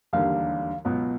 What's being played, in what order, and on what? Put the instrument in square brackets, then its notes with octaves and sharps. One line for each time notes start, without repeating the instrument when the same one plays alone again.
[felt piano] E1 D#2 D3 G3 A#3 [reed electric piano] F5
[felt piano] C#2 B2 F#3 B3